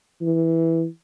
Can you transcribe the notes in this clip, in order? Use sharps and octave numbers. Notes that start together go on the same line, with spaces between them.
E3